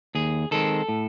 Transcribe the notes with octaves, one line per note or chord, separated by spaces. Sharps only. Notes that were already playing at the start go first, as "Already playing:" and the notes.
D#2 G#4
D#3 G#3 C4 A4
A2